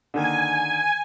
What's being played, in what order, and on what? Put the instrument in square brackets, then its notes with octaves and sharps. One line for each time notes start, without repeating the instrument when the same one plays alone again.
[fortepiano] D3 D#3 A#3 [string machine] G#5